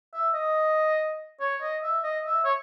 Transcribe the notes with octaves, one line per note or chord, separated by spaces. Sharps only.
E5
D#5
C#5
D#5
E5
D#5
E5
C#5